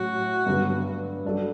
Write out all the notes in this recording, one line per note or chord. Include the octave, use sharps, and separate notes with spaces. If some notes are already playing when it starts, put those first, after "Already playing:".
Already playing: A2 F#3 C#4 F#4 C#5
G2 D3 F#3 B3
G3 D4 F#4 A4